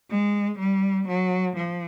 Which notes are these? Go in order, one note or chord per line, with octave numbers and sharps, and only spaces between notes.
G#3
G3
F#3
F3